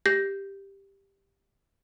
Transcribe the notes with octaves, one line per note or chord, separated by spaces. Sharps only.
G4 G6 A#6 C7